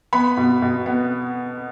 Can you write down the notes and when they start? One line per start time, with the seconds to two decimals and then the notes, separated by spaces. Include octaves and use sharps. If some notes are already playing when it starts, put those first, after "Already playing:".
0.13 B3 B5
0.37 B2
0.62 B2
0.86 B3